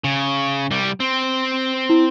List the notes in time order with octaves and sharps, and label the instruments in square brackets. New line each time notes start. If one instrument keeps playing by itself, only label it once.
[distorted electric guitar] C#3
C2 G3
C4
[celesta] E4